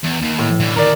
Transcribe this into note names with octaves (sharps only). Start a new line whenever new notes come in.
E2
D#2
A2
D3 E3
D2 D#3 A#4 D5